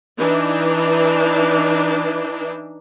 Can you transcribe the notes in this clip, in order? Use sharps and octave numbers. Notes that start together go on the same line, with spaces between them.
E3 D4 D#4